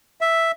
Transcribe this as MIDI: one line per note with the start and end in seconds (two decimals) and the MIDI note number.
0.21 0.51 76